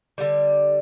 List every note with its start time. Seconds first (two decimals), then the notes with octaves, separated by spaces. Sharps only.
0.18 D3 G3